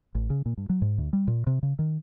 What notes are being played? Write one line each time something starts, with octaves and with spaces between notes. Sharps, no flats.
A1
C#3
A#2
G2
F#3
G#2
D2
G3
A#2
C3
C#3
D#3